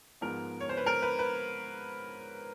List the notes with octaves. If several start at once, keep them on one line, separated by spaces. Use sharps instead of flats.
G#2 F3 G#3 B3 A#4
C#5
C5
B4
A#4
B4
B4